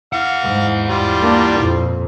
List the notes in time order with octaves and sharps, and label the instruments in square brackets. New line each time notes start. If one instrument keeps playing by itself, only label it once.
[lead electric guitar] E4 F#5 [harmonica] F5
[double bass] G#2
[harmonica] G3 F4
[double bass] A#3 D4
F2 A#2